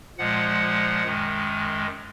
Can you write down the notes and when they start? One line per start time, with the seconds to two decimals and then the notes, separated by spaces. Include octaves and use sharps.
0.18 A#2 F3 G#3 F#5
1.05 F#2 D#3 G#3